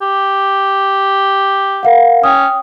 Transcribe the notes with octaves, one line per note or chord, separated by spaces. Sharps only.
G4
A#4 F5 F#5
C#4 G5 D#6